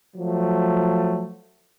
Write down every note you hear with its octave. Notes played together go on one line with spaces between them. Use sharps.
F3 F#3 A3